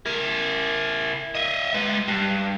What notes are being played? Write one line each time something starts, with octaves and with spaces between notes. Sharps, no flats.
E4 A#4
D#5 E5
G#3 B4
G2